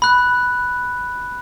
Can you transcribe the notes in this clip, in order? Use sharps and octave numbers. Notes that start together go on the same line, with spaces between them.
B5 F#6